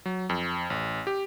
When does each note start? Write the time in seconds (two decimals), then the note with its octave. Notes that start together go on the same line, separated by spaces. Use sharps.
0.06 F#3
0.29 F2
0.70 A1
1.07 G4